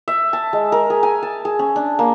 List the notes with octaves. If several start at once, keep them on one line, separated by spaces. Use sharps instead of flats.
E5
A5
G#3
A#4
G#4
G#5
A5
G#4
C#4
D4
A#3